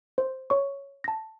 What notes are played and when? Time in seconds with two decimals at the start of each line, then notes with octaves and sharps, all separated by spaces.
0.18 C5
0.50 C#5 C#6
1.04 A5 A#6